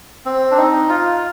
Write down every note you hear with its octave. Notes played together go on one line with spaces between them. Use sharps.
C4
D4
D#4
F4